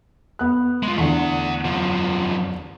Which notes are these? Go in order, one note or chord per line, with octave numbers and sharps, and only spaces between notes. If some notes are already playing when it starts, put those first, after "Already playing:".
B3 F#6
G#3 F4
E2 D3 A3 F#5
F#2 F3